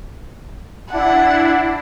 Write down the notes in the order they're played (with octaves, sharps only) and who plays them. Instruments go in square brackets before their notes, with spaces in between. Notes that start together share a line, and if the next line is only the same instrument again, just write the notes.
[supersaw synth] D4 E4 [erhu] F#5